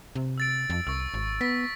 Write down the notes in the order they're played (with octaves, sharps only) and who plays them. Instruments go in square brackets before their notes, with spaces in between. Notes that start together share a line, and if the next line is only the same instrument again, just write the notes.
[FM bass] C3
[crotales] E6 A6 D7
[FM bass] F2
[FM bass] C2 [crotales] C#6 E6
[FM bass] G#1
[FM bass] B3 [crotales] B6